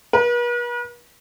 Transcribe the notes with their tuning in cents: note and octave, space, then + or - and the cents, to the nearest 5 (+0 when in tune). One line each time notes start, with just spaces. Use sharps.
B4 -45